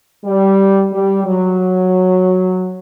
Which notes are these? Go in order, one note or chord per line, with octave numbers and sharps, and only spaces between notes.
G3
G3
F#3